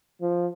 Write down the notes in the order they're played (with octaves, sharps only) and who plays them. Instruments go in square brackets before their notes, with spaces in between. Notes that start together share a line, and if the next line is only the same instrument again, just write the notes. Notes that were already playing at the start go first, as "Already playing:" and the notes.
[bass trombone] F3